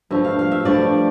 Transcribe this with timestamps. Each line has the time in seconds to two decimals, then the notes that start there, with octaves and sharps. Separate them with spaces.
0.10 G2 F3 A3 E5
0.25 F5
0.39 F5
0.52 E5
0.65 G2 F3 A3 D5